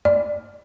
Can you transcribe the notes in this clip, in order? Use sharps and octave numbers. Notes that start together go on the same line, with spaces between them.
D5